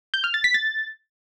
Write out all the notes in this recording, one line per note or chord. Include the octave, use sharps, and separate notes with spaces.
G6
F6
A6
B6
A6